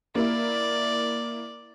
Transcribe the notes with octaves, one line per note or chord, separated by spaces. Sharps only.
A#3 E4 D5